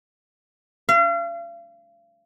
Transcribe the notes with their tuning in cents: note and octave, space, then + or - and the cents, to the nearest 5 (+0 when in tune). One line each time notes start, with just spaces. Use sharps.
F5 -40